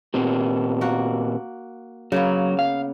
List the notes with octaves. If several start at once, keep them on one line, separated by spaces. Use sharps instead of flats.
A#2 C4 G4
A#3 F#4
C#3 F#3 A#3 B3
F5